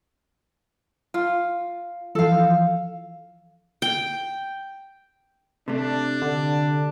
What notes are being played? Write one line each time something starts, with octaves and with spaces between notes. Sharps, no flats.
F4
E3 F3 A4 F5
G5
C3 A3 D4
D3